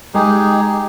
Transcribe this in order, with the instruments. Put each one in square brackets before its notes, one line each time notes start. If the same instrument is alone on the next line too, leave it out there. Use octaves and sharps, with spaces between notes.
[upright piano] G#3 [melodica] D#4 G4 G#4